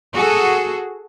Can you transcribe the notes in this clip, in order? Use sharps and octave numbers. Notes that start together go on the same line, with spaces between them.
F#4 G#4 A4